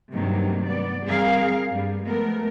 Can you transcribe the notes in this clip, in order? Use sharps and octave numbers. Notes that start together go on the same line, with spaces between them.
G2 C3 D#3 F#3 A3 A#3
B3 D5
G3 C4 G#4 A#4 F5
G2 G3 B3
F3 G#3 A3 B3 A#4